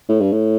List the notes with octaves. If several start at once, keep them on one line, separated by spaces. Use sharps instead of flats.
A2
G2
A2